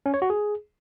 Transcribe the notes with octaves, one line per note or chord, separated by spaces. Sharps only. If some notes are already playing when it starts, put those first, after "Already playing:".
C#4
C#5
F#4
G#4